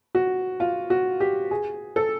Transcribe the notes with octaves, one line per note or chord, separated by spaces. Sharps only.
F#4
F4
F#4
G4
G#4
A4